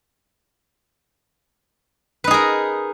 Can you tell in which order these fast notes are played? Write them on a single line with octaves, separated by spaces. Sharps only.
B4 D#4 G#4 A#4